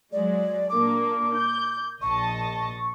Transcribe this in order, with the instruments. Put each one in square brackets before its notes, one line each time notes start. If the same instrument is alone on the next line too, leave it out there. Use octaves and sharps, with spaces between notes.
[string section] F#3 G#3 [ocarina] D5
[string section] A#2 A#3 D4 [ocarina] D6
[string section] G6
[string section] A#1 D#5 A5 [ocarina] C#6